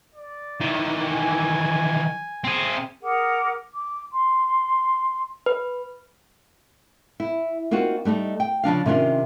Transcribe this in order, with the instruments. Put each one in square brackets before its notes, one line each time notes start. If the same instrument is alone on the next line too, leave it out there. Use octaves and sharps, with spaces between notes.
[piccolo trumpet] D5
[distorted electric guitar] D#3 E3
[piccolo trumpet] G#5
[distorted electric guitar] C4 G#4
[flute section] G#4 A#4 F#5 D6
D6
C6
[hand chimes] B4
[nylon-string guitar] E4
A#3 C4 D#4 F4 F#4
G3 A3 D4 D#4
G5
C#3 F3 D4 F5
C3 D#3 C#4 D4 F4